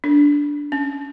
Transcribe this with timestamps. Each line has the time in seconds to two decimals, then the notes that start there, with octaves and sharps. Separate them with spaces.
0.04 D4
0.72 C#4